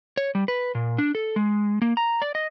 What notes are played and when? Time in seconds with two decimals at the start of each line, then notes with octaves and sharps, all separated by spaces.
0.17 C#5
0.35 G3
0.48 B4
0.75 A#2
0.98 D4
1.15 A4
1.36 G#3
1.82 A#3
1.97 A#5
2.22 D5
2.35 D#5